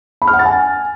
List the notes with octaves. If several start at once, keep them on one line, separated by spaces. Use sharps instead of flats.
B5
F6
F#5
A6
G#5